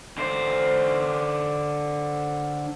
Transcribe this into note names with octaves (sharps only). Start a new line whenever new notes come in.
D3 C5